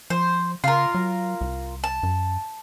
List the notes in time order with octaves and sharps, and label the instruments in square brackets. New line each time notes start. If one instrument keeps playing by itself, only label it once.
[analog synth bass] F3 [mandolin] C5
[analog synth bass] C#3 [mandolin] F4 A#4
[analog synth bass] F#3
C2
[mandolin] A5
[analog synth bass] F#2